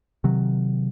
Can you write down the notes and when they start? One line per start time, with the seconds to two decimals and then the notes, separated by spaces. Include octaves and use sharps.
0.24 C3 D#3 F#3